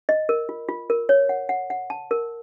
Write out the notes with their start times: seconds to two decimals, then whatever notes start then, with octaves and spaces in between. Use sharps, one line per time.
0.09 D#5
0.29 A#4
0.49 F4
0.69 F4
0.90 A#4
1.09 C#5
1.29 F#5
1.49 F#5
1.70 F#5
1.90 A5
2.11 A#4